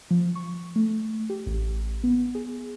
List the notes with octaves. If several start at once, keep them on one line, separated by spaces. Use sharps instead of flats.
F3
C#6
A3
G4
A1
B3
G#4